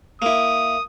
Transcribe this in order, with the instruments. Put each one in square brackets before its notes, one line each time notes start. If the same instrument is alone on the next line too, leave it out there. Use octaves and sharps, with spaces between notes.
[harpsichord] A#3 E4 [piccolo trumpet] D#6